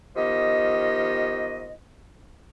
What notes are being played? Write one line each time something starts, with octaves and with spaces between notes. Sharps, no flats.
D#3 F3 B3 G4 D#5